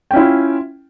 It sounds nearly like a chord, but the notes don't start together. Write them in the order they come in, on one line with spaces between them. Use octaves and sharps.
G5 C#4 E4 F4